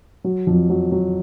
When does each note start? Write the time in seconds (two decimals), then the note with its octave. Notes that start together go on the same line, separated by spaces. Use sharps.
0.24 F#3
0.47 F2
0.70 F#3
0.92 F#3